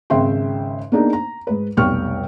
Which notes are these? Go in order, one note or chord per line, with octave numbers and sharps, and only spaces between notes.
G#1 C#3 E5 G5 C6
A#3 B3 D4 D#4 G#4
A#5
G#2 B4
F1 B1 G3 G5 C#6 F6